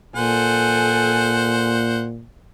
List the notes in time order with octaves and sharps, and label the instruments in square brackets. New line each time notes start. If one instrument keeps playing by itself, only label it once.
[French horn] A#2 [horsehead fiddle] A4 G#5 [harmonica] C5 F#5